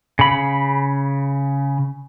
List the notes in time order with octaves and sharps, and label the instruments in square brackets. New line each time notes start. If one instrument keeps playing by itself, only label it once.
[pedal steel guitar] C#3 B5